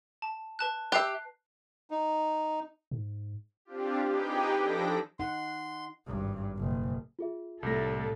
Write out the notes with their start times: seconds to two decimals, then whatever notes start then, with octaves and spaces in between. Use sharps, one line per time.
0.22 A5
0.59 B4 A5 F#6
0.92 G4 E5 F#6 C7
1.91 D#4
2.91 G#2
3.65 C4 D4 F4 G4
4.09 D#4 G4 G#4 B4 G5
4.58 F3 D4 A4 A#6 B6 D7
5.19 D#4 F#5 C6
6.06 G#1 G2
6.56 F#1 B2
7.19 F4 G#4 E5
7.63 C2 A2 A3 A4 A#6